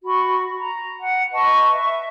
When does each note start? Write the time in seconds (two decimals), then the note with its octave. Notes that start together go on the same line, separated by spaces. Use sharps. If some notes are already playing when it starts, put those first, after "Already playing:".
0.04 F#4 B5 C#6
0.56 A#5
0.99 F#5
1.32 B4 D#5 A5 C#6
1.72 E5